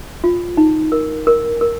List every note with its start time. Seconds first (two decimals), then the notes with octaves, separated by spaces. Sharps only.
0.24 F4
0.57 D#4
0.92 A#4
1.27 A#4
1.61 A#4